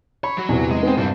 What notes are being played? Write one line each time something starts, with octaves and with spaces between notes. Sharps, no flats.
C#5 B5
F#3 F#4
E2 C3 E3
G#3
B3 C4
C2 G2 C4